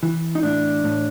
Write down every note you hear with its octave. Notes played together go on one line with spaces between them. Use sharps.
E3
D#4
A2 D4
A2